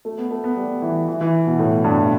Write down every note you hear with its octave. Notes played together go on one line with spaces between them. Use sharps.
A3
B3
A3
B3
G3
E3
E3
E3
B2
A2
G2
B2